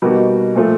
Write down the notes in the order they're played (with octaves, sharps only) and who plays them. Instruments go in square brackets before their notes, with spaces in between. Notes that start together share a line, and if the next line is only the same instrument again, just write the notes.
[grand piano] B2 G3 A#3 D#4 F#4
A#2 F3 A3